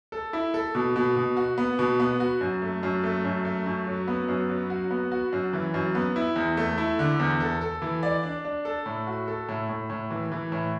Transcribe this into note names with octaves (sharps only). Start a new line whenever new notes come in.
A4
E4
A4
B2
B2
B2
F#4
B3
B2
B3
F#4
F#2
A3
F#2
A3
F#2
A3
F#2
F#3
B3
F#2
F#3
F#4
B3
F#4
F#2
E3
F#2
B3
E4
E2
A3
E4
D3
E2
A4
A4
E3
D5
D4
D4
A4
A2
F#4
A4
A2
A2
A2
E3
E3
A2